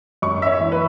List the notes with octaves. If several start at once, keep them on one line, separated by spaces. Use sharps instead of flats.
F#2 C#6
E5
C#5
E3
B4